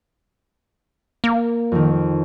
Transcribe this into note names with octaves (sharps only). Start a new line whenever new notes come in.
A#3
F2 D#3